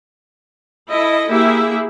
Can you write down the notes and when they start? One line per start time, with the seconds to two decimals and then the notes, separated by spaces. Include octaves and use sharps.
0.88 E4 A4 D#5
1.29 A#3 E4 G4 G#4 E5